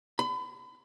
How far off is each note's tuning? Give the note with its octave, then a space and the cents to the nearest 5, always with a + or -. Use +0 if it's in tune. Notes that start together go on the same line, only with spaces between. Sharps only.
B5 +35